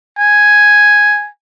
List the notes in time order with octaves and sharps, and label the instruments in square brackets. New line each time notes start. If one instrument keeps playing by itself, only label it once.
[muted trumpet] G#5